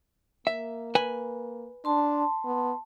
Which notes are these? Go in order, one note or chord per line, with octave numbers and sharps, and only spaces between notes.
A#3 E5
B4 G#5
D4 A5 C6
B3